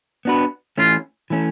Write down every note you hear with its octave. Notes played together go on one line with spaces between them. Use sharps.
B3 D4 F#4 B4
E3 A3 C#4 F4
E3 A3 C#4